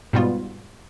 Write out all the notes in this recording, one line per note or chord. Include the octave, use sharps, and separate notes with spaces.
G#2 B2 G3 B3 F4